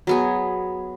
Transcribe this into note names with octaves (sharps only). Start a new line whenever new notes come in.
F#3 B3 G#4